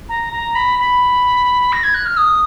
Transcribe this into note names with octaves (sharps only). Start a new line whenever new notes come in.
A#5
A#5
B5
B5
A#6
G#6
F#6
F6
D#6